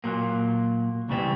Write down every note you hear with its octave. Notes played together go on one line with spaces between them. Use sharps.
A#2 F#3 A#3
C#2 C#3 E3 G3 C4